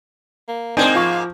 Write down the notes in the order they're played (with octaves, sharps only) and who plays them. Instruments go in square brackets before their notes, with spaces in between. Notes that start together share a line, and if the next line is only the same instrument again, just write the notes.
[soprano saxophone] A#3
[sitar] G#2 A#3 [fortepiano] C4 D#4 G#5 [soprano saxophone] D4
[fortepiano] F3 C#6 [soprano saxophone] F4